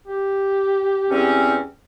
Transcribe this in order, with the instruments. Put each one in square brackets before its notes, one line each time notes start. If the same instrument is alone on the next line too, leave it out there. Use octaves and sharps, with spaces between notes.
[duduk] G4
[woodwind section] E2 C4 C#4